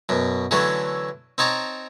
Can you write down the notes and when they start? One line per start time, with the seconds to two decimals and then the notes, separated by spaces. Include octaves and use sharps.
0.09 F#2 B2
0.51 D3 E3 F#3 A3 C#4
1.38 C4 D#4 C#5 A5 A#5